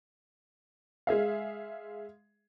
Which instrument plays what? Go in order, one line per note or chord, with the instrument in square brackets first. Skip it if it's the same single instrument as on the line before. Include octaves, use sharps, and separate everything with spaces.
[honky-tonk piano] G#3 G#4 E5 F5